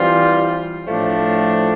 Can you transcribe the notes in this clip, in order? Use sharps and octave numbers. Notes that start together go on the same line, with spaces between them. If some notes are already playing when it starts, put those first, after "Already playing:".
Already playing: E3 G3 C4 F4
A2 F3 A3 D4